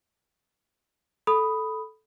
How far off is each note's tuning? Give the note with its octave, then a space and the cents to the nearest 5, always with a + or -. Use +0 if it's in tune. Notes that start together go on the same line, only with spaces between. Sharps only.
A4 -10 B5 +5 D#6 +0